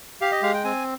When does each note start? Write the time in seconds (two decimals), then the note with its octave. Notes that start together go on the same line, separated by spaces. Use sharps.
0.21 G4 F5
0.32 D#5
0.42 G#3 F5
0.54 G5
0.64 C4 G#5